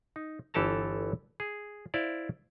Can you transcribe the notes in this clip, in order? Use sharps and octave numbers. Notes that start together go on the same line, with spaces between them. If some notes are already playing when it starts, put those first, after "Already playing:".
D#4
G1 E3 G4 A4 A5 A#5
G#4
E4 C5 D5 F5